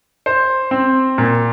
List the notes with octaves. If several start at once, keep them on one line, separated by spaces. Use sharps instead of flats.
C5
C4
A#2